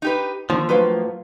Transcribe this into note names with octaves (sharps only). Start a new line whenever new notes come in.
D#4 G4 B4
D3 D#3 F3 A#3
A2 F#3 A#3 B4 C5 F5